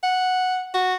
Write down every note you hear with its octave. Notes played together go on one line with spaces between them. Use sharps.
F#5
F#4